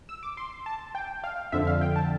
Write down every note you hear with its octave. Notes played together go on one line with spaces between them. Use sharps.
E6
D6
C6
A5
G5
F5
F2 D3 F3 E5
F5
G5
A5